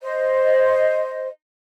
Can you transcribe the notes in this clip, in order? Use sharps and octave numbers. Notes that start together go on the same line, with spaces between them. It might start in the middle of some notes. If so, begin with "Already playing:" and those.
C5 D#5